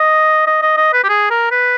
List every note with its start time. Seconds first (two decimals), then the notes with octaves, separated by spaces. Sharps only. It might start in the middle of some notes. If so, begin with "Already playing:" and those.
Already playing: D#5
0.47 D#5
0.62 D#5
0.77 D#5
0.93 B4
1.04 G4
1.09 G#4
1.30 A#4
1.51 B4